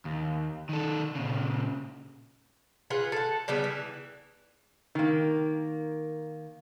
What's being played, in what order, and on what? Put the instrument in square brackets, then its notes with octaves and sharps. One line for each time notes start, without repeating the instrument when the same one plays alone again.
[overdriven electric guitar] D#2
D#3 A4
A#2 C#3
[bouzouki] F4 G#4 B4 F#5
A4 F#5
C#3 G3 B3 F#4
E3
[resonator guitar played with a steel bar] D#3 A#3